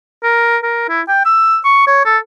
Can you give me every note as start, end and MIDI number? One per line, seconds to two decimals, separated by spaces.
0.23 0.57 70
0.63 0.84 70
0.89 1.01 64
1.08 1.23 79
1.25 1.58 88
1.65 1.82 85
1.87 2.04 73
2.06 2.18 69